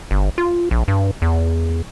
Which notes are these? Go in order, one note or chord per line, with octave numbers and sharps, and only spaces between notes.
G1
F4
A#1
G2
E2